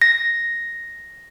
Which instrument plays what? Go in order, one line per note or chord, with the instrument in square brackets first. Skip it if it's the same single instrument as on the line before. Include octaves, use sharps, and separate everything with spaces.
[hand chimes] A#6